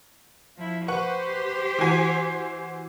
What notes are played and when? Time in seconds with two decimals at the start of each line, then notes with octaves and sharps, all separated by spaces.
0.57 F3 E4
0.88 G4 B4 C5 F#5 C#6
1.78 E3 F#4 G#5